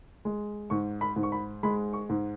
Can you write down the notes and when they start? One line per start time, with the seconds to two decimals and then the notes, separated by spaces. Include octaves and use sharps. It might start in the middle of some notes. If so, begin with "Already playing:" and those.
0.25 G#3
0.70 G#2 C#6
1.01 B5
1.16 G#2
1.23 C#6
1.32 B5
1.63 G#3 B5
1.93 C#6
2.09 G#2